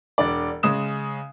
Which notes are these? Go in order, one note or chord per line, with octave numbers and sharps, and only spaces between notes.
E1 D4 D5
C#3 G#3 D#6 E7